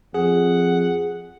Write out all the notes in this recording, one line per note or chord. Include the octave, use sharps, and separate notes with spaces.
F2 G#4 F#5